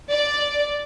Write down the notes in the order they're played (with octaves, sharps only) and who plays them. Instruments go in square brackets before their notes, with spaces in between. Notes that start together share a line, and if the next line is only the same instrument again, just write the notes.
[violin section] D5